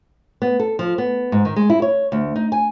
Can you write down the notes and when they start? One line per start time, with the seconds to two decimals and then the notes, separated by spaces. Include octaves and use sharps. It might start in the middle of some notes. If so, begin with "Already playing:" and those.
0.42 B3
0.60 A4
0.79 F3
0.98 B3
1.32 G#2
1.45 D#3
1.56 G#3
1.70 E4
1.82 C#5
2.12 D2
2.36 D#4
2.52 G#5